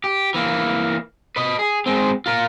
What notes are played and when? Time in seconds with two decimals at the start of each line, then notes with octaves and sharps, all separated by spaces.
0.04 G4
0.34 E3 A#3
1.36 B4 D#5
1.59 G#4
1.86 G#3 C4
2.26 F4 A#4